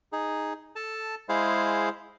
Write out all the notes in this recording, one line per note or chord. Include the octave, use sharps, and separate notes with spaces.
D#4 G#4
A4 A5
G#3 E4 G#4 C5 F5